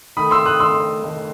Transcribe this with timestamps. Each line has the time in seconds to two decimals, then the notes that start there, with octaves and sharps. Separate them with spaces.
0.17 D#3 A3 B5 D#6
0.31 C6 E6
0.46 D#6 F#6
0.60 D#3 A3 C6 E6
1.04 D#3 A3